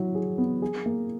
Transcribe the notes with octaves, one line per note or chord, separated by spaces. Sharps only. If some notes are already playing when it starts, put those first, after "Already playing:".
Already playing: F#3 E4
G#4
B3
G#4
A#3